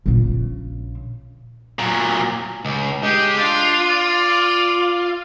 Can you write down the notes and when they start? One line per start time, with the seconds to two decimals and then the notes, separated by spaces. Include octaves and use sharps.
0.06 A#1 C#3
1.79 A#2 F#3
2.65 C#2
3.03 G#3 G4
3.38 D4 F4
3.90 D5